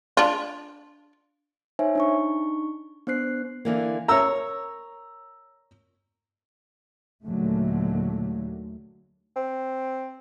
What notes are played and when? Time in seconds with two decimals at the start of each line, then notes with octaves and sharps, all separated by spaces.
0.17 D4 F4
1.79 D#4 C5 C#5 E5 G#5
1.95 D4 D#4 C#6
3.07 B3 D4 C5 F#6 C7
3.65 D3 E3 A#3
4.08 A#4 C#5 A#5 E6
7.25 D#2 A#2 D3 F#3 G#3 A3
9.36 C4